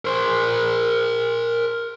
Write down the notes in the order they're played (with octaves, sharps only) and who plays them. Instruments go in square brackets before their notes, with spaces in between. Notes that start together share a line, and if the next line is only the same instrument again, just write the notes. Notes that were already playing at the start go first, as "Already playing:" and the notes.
[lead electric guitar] A#4 C5